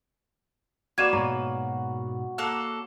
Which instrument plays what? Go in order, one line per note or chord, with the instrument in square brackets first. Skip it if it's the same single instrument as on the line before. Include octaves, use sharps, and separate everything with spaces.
[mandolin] A#3 B4 [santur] F#4 D5 A#5 [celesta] G#6 D#7 E7
[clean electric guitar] G#2 B2 [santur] C#5 [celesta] A#5
[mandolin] A#3 A4 F#6